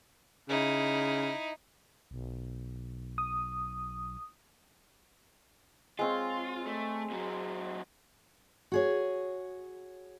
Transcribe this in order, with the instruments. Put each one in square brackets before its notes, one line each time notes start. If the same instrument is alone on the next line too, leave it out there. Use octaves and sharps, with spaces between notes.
[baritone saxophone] C#3 [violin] D#4 E4
[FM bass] B1
[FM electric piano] D#6
[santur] G#3 C4 C#5 [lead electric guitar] F4
[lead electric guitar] A3
A#2 F#3
[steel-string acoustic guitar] F#4 G#4 C#5